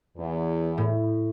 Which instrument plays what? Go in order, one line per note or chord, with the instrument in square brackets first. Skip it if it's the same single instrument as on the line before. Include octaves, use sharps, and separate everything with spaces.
[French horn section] E2
[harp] A2